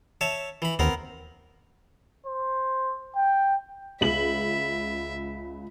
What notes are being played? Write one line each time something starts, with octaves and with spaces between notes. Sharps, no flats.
C#5 E5 A5
E3 B5
D#2 B3 C4 A#4
C5
G5
C#2 E5 F#7